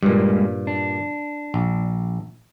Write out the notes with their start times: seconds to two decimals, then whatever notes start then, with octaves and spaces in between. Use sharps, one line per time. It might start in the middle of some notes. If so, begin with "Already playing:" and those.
0.03 G2 A#2 G3 G#3 A#3
0.67 D4
1.54 A#1